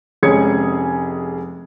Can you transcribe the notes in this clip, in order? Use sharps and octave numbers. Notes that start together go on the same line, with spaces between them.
F1 G#3 C#4 G#4 G#6 C#7